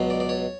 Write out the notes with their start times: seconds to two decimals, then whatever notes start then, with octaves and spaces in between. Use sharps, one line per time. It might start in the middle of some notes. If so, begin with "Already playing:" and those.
Already playing: C#2 B2 F#3
0.10 D5
0.20 D5
0.29 C#5